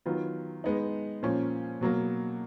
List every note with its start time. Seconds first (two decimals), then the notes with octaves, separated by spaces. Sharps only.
0.06 D#3 F#3 B3 F4
0.64 G#3 B3 D#4
1.23 A#2 F3 A#3 C#4
1.81 B2 F#3 A#3